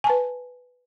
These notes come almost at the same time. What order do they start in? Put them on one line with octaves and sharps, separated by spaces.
G#5 A5 B4